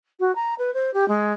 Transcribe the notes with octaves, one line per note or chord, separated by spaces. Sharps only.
F#4
A#5
B4
C5
G4
G#3